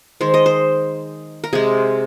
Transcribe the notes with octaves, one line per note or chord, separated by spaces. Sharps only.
D#3 G#3 C5
D#5
C5
A#4
C3 G#3 G#4